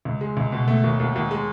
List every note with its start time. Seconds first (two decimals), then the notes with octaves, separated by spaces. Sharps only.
0.05 C#2
0.21 G#3
0.37 C#2
0.52 B2
0.68 A3
0.84 D#2
1.00 D#2
1.16 D#2
1.31 G#3